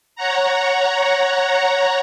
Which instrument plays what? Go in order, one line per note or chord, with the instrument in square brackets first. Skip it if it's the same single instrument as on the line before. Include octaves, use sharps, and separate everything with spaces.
[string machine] C#5 F#5 A#5